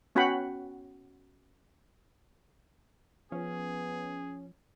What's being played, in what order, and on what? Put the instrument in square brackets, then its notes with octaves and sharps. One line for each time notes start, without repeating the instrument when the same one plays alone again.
[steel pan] B3 C#4 F#4 F#5 G5 B5
[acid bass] F3 [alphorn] B3 [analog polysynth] C#4 [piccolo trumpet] G#4